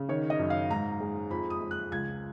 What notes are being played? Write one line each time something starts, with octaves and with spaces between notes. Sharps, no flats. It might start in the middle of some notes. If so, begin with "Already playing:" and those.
Already playing: C#3
D#3 C#5
D#5
F#2
F5
G#2 A#5
G#3
F2 B5
D#6
G#3
F#6
C#2 G#6